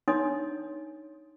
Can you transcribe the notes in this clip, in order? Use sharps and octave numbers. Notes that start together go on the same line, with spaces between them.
D4 D#4 C#5 G#5 C6 D#6